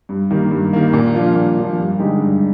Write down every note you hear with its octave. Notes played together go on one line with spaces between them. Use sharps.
G2
D#3 G3 A#3
G2
D#3 G3 A#3
A#2
F3 A#3 D4 F4
A#2
F3 A#3 D4 F4
G2
D3 G#3 D#4 G4
G2